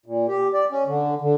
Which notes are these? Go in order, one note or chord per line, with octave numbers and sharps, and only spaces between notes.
A#2
G4
D5
C#4
D3
D3